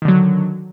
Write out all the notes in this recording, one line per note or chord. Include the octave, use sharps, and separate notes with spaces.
D3 D#3 F#3